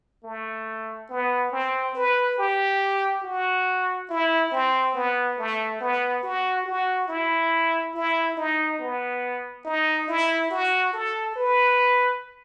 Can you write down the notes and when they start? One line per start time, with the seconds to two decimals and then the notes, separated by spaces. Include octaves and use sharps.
0.24 A3
1.09 B3
1.52 C4
1.95 B4
2.38 G4
3.23 F#4
4.10 E4
4.52 C4
4.95 B3
5.38 A3
5.81 B3
6.23 F#4
6.66 F#4
7.09 E4
7.94 E4
8.37 D#4
8.79 B3
9.65 D#4
10.08 E4
10.51 F#4
10.93 A4
11.36 B4